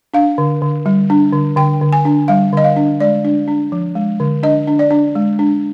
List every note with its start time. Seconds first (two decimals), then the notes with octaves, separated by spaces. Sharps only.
0.14 D4 F5
0.38 D3
0.62 D3
0.86 G3
1.10 D4
1.33 D3
1.57 D3 G5
1.81 D3
1.93 G#5
2.05 D4
2.28 G3 F5
2.52 D3 D#5
2.64 F5
2.76 D4
3.00 G#3 D5
3.25 D4
3.48 D4
3.72 F3
3.95 G#3
4.20 D3
4.43 D4 D#5
4.67 D4
4.79 D5
4.91 D4
5.15 G#3
5.39 D4